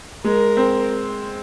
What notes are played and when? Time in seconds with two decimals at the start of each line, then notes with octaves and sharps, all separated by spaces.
0.24 G#3 A#4
0.57 C4